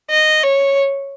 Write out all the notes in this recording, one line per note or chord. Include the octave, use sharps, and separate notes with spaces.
D#5
C#5